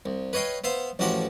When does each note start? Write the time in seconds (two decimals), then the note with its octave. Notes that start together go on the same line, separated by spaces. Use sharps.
0.06 C2
0.33 B4 C#5 D#5 F5 G5
0.64 B3 C5 E5 F5
0.99 A1 A2 F3 F#4 G4 D6